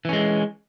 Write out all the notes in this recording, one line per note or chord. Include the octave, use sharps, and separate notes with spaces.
E3 G#3 C#4